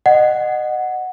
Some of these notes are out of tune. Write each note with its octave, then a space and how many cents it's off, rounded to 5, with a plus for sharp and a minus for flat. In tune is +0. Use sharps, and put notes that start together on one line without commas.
D#5 -25 F#5 +0